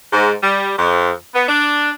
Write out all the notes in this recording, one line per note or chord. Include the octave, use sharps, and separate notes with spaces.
G#2
G3
F2
B3
D4